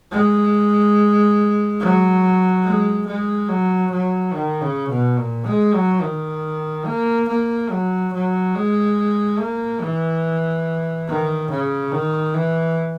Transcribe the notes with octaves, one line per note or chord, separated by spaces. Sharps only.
G#3
F#3
G#3
G#3
F#3
F#3
D#3
C#3
B2
A#2
G#3
F#3
D#3
A#3
A#3
F#3
F#3
G#3
A#3
E3
D#3
C#3
D#3
E3